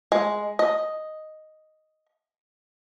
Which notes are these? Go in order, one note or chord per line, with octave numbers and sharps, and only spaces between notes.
G#3
D#5